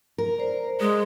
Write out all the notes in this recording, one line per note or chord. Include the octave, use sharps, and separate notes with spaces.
A#4
C5 D5
G#3 G#4 D#6